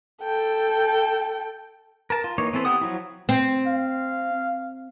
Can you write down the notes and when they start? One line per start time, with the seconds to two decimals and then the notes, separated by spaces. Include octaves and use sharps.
0.23 A4 G5
2.10 A#4 A5
2.24 F4
2.38 E3 A#3 D#4 C#5
2.53 E3 B3 C4 A4 B4
2.65 E4 G4 F#5 D#6
2.81 F3 F#3 E4
3.29 C4
3.67 F5